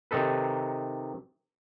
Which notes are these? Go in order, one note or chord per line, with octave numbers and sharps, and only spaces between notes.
C3 D#3 D#4 A4 B4